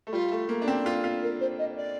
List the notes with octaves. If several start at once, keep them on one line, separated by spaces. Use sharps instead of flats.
A3
G3 F4
A3
A#3
D4
C4
F4
F4
A#4
C5
D#5
D5